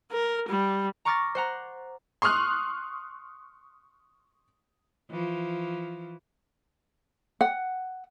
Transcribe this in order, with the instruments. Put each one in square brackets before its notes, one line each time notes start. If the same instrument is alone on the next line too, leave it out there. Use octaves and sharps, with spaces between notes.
[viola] A#4
G3
[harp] A#5 C#6 D6 F6 A6 A#6
C5 F#5 A#5
[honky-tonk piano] C6 C#6 D#6 F6 F#6
[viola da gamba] E3 F3
[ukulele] F#5